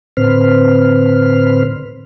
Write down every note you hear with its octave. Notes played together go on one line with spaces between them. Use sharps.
A2 D3 C4 B4 C5 F6